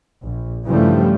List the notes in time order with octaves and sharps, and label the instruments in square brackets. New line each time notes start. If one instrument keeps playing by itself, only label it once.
[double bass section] A#1
G2 C#3 E3 F3 G3 A3